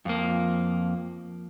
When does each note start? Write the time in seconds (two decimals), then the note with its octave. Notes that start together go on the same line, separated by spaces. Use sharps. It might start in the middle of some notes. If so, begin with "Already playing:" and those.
0.05 F2 F3 A#3